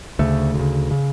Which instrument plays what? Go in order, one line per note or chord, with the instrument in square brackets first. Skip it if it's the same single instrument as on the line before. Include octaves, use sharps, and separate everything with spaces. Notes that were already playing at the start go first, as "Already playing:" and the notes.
[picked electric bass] D2 C#3 A3
D2
C#3
C#3